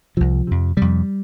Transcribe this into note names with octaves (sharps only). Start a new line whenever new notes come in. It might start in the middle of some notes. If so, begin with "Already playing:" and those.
C2 C3 F3
F2 C3
F2 C3 G3